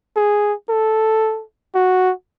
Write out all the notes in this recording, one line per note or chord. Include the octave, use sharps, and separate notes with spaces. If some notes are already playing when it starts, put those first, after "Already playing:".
G#4
A4
F#4